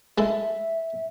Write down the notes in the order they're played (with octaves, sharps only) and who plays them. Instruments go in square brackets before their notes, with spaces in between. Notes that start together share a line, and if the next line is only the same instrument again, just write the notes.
[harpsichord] G#3 E4 A4 [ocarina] E5